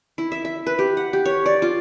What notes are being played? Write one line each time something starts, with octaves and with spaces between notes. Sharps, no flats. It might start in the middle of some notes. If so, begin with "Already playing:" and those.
E4
E5
E5
B4
G4
F#5
G4
C#5
D5
F4